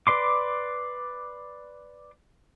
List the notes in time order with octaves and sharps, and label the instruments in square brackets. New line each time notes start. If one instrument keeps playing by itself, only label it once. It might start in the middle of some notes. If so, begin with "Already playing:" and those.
[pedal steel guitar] B4 D5 C6 D6